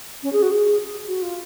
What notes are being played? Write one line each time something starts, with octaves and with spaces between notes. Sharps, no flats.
C#4
G#4
F#4
G#4
F#4
F4